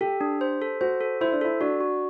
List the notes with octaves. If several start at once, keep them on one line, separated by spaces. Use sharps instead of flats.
G4 A4
D4
C5
A4
F#4 C5
A4
E4 C5
D4
E4 A4
D4 F#4
F#4